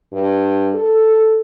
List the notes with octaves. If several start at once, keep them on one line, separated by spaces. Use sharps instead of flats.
G2
A4